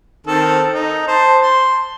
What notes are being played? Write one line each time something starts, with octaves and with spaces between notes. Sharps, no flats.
D#3 C4 A4
D#4
C5 A5
C6